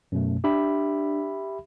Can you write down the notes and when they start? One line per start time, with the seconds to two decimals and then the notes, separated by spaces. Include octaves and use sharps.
0.12 F#2 B2 A3
0.44 D4 G4 E5 B5